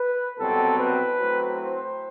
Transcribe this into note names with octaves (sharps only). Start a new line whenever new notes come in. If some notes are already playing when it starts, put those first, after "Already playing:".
Already playing: B4
C2 B2 F#3 C4 A4
B4
A2 F#3 C4
C5